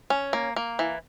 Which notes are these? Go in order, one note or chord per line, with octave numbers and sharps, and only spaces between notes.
C#4
A#3
A#3
E3